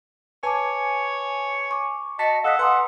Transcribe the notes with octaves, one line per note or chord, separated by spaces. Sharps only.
B4 C#5 G#5 A5 D6
C#6 D6
F#4 D#5 A5 B6
A4 D#5 F5 F#5 D#6 F#6 B6
B4 F#5 G#5 A#5 C6 D#6